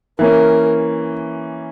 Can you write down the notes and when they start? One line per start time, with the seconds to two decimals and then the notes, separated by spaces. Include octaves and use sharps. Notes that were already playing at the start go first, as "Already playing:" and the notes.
0.19 E3 A#3 C#4 A#4